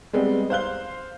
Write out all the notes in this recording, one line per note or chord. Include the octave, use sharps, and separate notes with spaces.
G3 G#3 B3 C4
C5 F5 F#6 G7